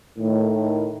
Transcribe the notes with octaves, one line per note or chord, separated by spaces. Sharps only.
A2 D#3